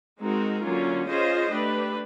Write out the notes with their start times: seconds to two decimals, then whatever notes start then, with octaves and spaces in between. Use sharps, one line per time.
0.19 G#3 C4 D#4 F#4 A#4
0.63 D3 F#3 A#3 C#4 F4
1.07 C#4 F4 G#4 C5 D#5
1.50 A3 D4 G4 B4